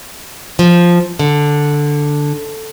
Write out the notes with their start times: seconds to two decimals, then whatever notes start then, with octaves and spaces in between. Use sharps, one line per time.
0.59 F3
1.19 D3